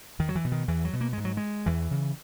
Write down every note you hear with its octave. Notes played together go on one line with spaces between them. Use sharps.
E2 D#3
F#3
E3
B2
D#3
E2 E3
F#3
B2
A#3
G#2 G#3
F#3
G#3
E2 E3
C#3